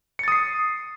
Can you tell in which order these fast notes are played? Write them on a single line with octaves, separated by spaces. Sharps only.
C#7 A6 D#6 C7